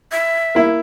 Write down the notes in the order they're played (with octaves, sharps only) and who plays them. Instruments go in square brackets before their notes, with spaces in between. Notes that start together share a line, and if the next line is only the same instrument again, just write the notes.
[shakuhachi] E5
[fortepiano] A#3 E4